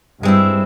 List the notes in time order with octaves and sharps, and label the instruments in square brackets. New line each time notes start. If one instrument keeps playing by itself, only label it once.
[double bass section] G2 [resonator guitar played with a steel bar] G#3 C4 E4